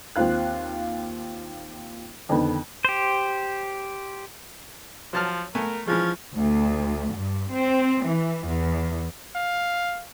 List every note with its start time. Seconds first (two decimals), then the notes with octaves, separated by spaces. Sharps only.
0.16 D#2 C4 F4 F5 F#6
2.29 F2 D3 D#3 B3
2.85 G4 C5
5.13 F3 F#3 A5 F6
5.55 A3 B3 A#4 G#5
5.88 E3 F3 G#3 C#4
6.35 D2
7.13 G2
7.53 C4
8.07 E3
8.48 E2
9.36 F5